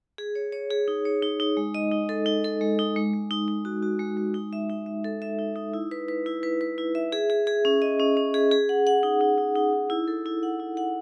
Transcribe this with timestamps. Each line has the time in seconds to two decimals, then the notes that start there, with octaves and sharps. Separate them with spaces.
0.18 G#4
0.35 C#5
0.52 C#5
0.70 G#4
0.88 D#4
1.05 C#5
1.23 D#4
1.40 D#4
1.57 G#3
1.75 D#5
1.92 D#4
2.09 A4
2.26 D#4
2.44 A4
2.61 G#3
2.79 D#4
2.96 G#3
3.13 G#3
3.31 D#4
3.48 D#4
3.65 F#4
3.83 F#4
3.99 G#3
4.17 G#3
4.34 D#4
4.53 E5
4.69 D#4
4.86 E5
5.04 A4
5.22 E5
5.39 D#4
5.56 D#4
5.74 E4
5.91 B4
6.08 B4
6.26 E4
6.43 B4
6.61 B4
6.78 E4
6.95 E5
7.12 G#4
7.30 G#4
7.47 G#4
7.65 C#4
7.82 D#5
7.99 C#4
8.17 C#4
8.34 G#4
8.52 G#4
8.69 F#5
8.87 F#5
9.03 D#4
9.21 D#4
9.38 D#4
9.56 D#4
9.73 D#4
9.90 E4
10.08 A4
10.26 E4
10.43 F#5
10.60 E4
10.77 F#5